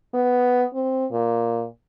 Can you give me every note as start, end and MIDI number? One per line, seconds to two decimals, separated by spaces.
0.14 0.65 59
0.74 1.06 60
1.11 1.65 46